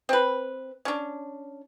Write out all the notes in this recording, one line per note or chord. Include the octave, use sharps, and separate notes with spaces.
C4 B4
C#4 D4